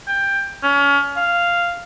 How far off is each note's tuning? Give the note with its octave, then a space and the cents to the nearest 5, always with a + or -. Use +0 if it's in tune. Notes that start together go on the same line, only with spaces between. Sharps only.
G5 +15
C#4 +30
F5 -5